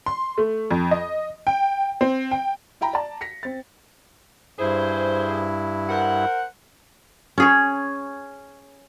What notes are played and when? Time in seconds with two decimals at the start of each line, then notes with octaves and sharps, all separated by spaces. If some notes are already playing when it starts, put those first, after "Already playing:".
0.06 C6
0.38 A3
0.71 F2
0.91 D#5
1.47 G5
2.01 C4
2.31 G5
2.81 E4 E5 G5 A#5 B5
2.93 D5 A5 A#5
3.21 A#6 B6 C#7
3.43 C4 A6
4.58 G2 E4 G#4 C5
5.89 A#4 C5 F#5
7.38 C#4 G#4 C#5